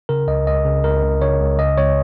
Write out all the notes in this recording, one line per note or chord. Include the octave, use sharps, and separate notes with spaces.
C#3 A#4
C#2 D#5
C#2 D#5
C#3
C#2 A#4
C#2
C#3 C#5
C#2
C#3 D#5
C#2 C#5